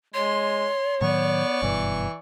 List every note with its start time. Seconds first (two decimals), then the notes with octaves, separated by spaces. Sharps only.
0.14 G#3 C#5 C6
1.01 A2 D#3 F#3 B3 D5 C#6
1.62 F#1 G2 B2 E3